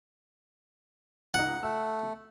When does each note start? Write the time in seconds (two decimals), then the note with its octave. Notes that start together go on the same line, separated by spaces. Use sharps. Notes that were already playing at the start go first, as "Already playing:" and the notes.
1.34 C#2 D#4 F#5
1.63 A3 E6